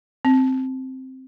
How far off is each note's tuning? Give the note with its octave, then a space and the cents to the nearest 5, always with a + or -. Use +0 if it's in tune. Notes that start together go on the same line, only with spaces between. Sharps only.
C4 +0